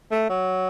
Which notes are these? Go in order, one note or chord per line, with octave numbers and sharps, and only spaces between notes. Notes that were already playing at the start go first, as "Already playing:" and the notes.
A3
F#3